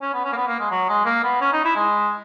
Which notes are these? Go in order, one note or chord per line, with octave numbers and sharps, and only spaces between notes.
C#4
B3
C#4
A#3
B3
A#3
G#3
F#3
G#3
A#3
B3
C#4
D#4
E4
G#3